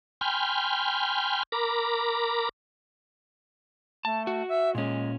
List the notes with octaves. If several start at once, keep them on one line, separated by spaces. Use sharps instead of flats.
G5 G#5 B5 C6 F6 G6
A#4 A#5 B5 D6
A3 A5
F#4
E5
A#2 G#3 C#4